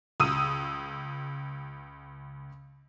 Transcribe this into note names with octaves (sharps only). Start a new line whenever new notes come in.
C#2 D#6 E6 D#7